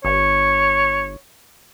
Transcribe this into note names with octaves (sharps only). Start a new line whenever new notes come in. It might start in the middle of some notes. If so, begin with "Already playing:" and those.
G1 C#5